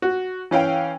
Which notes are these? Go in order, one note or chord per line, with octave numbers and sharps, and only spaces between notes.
F#4
E3 C#4 F5 G5